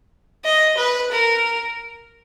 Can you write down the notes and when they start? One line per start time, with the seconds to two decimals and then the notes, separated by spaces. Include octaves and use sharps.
0.44 D#5
0.77 B4
1.11 A#4